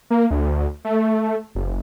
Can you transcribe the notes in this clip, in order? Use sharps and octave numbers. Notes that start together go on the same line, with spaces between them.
A#3
D2
A3
F#1